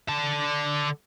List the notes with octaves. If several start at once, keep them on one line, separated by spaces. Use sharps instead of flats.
D3 A5